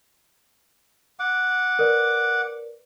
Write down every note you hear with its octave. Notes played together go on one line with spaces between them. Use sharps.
F#5 D6
A#4 B4 D5